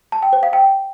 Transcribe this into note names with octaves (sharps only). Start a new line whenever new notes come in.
A5
G5
C5
F5
G5